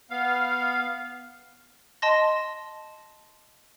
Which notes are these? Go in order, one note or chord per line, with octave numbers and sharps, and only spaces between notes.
B3 F5
D#5 A5 C6 A#6